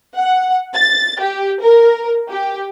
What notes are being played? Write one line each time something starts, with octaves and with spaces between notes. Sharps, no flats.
F#5
A6
G4
A#4
G4